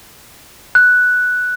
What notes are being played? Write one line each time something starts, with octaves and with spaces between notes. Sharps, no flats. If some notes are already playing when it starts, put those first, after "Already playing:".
F#6